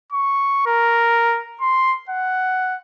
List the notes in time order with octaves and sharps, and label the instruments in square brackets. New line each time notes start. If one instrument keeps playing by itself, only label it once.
[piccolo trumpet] C#6
A#4
C6
F#5